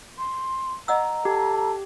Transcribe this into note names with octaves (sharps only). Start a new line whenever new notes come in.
C6
D#5 F#5 A#5 E6
G4 A4